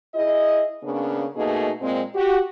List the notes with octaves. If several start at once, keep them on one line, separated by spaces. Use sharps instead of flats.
E4 G#4 D#5
C#3 A#3 B3 C#4 D4
B2 A3 A#3 D#4 G#4
A#2 G#3 C4
F#4 G4